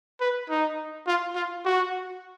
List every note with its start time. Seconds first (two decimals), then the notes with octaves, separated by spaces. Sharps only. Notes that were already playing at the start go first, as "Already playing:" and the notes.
0.21 B4
0.50 D#4
1.07 F4
1.36 F4
1.65 F#4